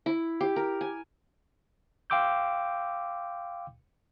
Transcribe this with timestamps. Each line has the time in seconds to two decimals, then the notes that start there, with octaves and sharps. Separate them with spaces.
0.06 E4
0.41 G4
0.56 A#4
0.81 G#5
2.10 F5 G5 C6 D6 E6 G6